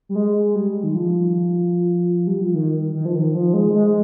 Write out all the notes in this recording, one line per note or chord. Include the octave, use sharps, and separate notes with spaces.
G3
G#3
G3
D#3
F3
G3
F3
D#3
D#3
F3
D#3
F3
G#3
G#3